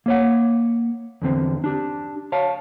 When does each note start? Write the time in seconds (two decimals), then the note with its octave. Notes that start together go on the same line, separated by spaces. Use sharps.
0.06 A#3 C#5 F#5
1.22 E2 D3 C4
1.64 D4 G4
2.32 C#5 F5 A5